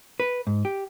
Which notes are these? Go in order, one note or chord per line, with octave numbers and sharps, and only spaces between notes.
B4
G#2
G4